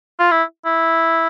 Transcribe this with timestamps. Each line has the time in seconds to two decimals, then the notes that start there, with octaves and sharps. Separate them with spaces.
0.19 F4
0.31 E4
0.66 E4